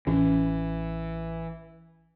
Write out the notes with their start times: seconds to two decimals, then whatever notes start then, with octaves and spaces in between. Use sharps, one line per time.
0.07 A1 E3 C#4